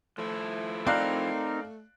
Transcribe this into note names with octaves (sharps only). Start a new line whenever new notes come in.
F3 A3 E4
C4 D#4 A#4 D5 F5 F#6